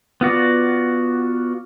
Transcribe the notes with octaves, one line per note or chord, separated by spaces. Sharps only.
B3 F4 F#4 D5